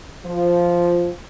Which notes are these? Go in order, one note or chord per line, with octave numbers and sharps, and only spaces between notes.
F3